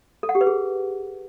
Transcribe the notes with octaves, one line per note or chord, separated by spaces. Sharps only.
A4
F#5
G4
B4
G#4